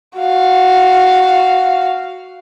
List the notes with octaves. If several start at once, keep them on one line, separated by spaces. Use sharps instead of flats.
F#4 F5